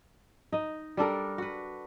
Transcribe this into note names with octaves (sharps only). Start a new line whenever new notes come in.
D#4 D#5
G3 D4 A4 A#4
F#4 B4